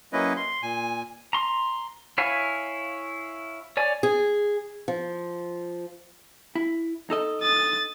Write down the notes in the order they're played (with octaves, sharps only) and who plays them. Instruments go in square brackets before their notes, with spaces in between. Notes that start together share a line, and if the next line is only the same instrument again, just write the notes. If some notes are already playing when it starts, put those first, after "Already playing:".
[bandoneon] F#3 A#3 C#4 E4 B4 D#5
C6
A#2 G#5
[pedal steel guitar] A#5 C6
E4 C#5 F5 G#5
C#5 D5 G#5
[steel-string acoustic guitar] G#4
F3
[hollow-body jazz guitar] E4
D#4 A4 D#5
[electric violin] D#6 A6